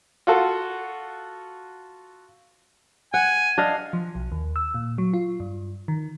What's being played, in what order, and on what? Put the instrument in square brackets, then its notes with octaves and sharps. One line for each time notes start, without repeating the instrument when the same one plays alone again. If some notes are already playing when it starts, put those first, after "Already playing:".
[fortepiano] F4 F#4 A4
[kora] F#5 [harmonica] G#5
[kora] D4 D#5 F5
[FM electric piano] F3
B1
D#2
E6
A#2
F#3
F4
G2
D#3